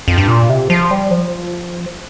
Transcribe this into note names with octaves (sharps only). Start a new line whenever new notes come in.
F2
G2
A#2
C3
F3
G3
F3